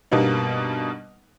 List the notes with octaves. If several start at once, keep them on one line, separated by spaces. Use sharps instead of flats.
G2 B2 G3 A#3 B3 D#4